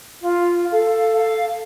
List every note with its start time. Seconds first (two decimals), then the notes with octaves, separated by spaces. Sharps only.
0.21 F4
0.71 A4 F5
1.18 F5